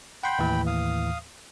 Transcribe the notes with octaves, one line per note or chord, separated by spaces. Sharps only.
F#5 G5 B5 C6 G6
D#2 A2 E3
F5 D#6